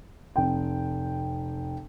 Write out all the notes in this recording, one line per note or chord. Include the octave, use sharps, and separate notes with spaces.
F1 G5